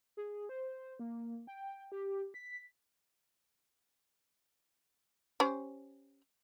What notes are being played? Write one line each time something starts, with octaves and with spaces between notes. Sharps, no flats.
G#4
C5
A#3
G5
G4
B6
C#4 G4 C5